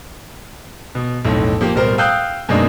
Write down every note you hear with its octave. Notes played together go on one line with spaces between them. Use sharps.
B2
B1 F2 A2
F3 A#3 G4
D1 B2 G3 A#4 C5
F5 G5 D#6 E6 F#6 G6
F#2 B2 G#3 A#3 D4 D#4